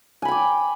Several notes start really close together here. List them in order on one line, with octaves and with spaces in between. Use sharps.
G#5 B5 G5 D6